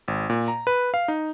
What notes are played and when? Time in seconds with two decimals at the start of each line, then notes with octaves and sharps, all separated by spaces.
0.08 G#1
0.30 A#2
0.48 A#5
0.67 B4
0.94 F5
1.08 D#4